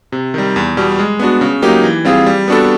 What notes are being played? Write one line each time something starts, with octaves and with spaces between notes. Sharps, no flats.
C3
D#3 G3
E2
B2 G3
G#3
B3 D4 F#4
C#3
F#3 A#3 D#4 G4
E3
G3 C4 F4 G#4
G3
B3 D4 F#4 A4